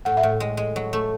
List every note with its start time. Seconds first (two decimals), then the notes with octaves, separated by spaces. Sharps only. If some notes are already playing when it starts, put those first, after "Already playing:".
0.05 A2 F#5
0.17 E5
0.23 A2
0.29 A4
0.40 G#3
0.57 G#3
0.76 F#3
0.93 A3